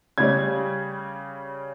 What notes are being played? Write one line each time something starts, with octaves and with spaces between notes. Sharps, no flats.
C#3 G3 C#4 G#6